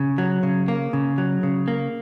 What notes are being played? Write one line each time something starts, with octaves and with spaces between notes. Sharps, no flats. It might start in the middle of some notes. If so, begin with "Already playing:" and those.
Already playing: C#3
F#3
C#3
A#3
C#3
F#3
C#3
A#3